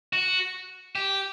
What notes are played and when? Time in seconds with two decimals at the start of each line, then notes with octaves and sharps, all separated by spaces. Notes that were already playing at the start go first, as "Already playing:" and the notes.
0.13 F#4
0.95 G4